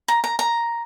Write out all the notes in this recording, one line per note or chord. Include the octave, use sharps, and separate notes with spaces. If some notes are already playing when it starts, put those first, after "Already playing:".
A#5
A#5
A#5